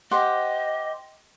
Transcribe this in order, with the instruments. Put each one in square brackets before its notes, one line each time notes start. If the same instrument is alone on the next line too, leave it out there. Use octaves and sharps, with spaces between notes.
[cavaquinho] G4 C5 F#5 [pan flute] D#5